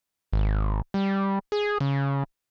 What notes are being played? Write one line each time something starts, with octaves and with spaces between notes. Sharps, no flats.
G#1
G3
G#4
C#3